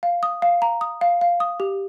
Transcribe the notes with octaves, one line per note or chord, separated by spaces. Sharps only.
F5
D#6
F5
A#5
D#6
F5
F5
D#6
G4